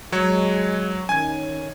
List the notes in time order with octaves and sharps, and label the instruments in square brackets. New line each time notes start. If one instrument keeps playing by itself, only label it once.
[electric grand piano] F#3 C#5 [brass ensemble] G#3
[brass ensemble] D#3 C#4 [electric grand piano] G#5 G#6